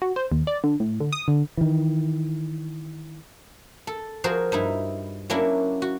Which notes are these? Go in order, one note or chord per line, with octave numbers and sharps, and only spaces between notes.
F#4
C5
D#2
D5
D3
A2
D3
D#6
D3
D#3 E3
A4
F3 F#4 G#4 A#4 C5
G2 D#4 E4
F#3 A#3 C#4 D4 E4 F#4
F#4